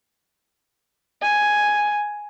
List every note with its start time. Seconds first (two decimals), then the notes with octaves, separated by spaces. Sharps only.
1.22 G#5